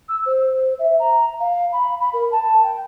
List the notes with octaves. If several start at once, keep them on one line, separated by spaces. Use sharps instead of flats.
E6
C5
E5
A#5
F5
B5
B5
A#4
A5
G5